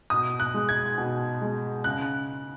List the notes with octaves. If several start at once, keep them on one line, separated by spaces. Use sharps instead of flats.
B2 D#6
F#6
G#3
G#6
B2
G#3
C#3 F#6